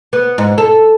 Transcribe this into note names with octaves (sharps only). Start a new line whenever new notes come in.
B3
G#2
A4